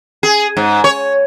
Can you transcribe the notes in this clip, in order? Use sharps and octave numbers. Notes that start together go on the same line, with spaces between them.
G#4
G#2
C#5